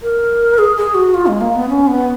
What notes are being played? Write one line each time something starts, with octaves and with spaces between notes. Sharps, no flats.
A#4
G#4
G#4
F#4
F4
G#3
A#3
B3
C#4
B3